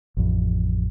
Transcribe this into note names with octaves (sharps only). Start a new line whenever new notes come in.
A1 F2